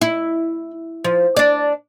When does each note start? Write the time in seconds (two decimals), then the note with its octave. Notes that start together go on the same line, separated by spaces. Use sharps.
0.01 E4
1.04 F3
1.37 D4 D5